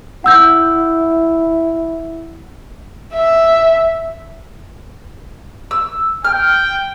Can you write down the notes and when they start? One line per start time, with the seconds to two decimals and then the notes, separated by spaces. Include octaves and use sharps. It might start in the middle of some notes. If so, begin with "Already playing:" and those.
0.24 E4 F#5 E6 G6
3.14 E5
5.71 E6
6.25 G5 F6